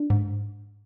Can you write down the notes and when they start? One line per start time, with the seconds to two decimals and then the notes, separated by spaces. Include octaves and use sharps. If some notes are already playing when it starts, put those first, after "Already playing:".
Already playing: D4
0.10 G#2